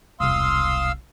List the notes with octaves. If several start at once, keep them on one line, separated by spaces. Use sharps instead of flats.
E1 C2 F5 C6 D#6 E6